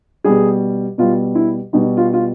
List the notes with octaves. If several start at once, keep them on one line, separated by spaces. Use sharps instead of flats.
B2 G3 G#4
B2 G3 F4
E4
B2 G3 D#4
F4
F4